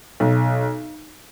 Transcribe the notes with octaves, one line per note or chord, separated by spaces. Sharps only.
B1